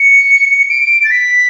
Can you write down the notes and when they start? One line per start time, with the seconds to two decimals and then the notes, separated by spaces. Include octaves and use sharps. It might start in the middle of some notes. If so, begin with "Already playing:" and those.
Already playing: C#7
0.70 D7
1.04 A6
1.11 B6